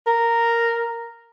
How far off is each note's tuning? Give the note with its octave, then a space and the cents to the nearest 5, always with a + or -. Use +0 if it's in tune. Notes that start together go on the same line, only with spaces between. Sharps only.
A#4 -5